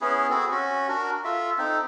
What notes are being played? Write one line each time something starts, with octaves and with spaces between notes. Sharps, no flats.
B3 C#4 E4 G#4
C4 F#4 G#4 A4
C#4 F#4
D4 F#4 A#4
F4 A4 E5
C4 D#4 A4